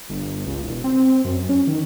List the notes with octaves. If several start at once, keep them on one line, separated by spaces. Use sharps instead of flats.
G1
C#2
E1
C4
F#2
C#4
D#3